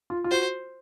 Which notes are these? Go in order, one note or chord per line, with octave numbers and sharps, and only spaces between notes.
F4
F4
F#4 C5